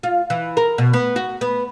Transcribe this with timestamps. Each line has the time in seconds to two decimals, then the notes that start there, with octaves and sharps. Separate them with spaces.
0.03 F4
0.30 E3
0.57 A#4
0.78 B2
0.93 B3
1.16 F#4
1.41 B3